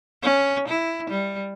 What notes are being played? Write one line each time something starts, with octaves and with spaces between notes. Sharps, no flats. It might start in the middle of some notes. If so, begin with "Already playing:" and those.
C#4
E4
G3